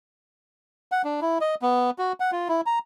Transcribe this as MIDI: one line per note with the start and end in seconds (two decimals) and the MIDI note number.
0.92 1.02 78
1.04 1.20 62
1.21 1.38 64
1.41 1.55 75
1.62 1.90 59
1.98 2.13 66
2.20 2.31 78
2.32 2.48 65
2.49 2.61 64
2.66 2.79 82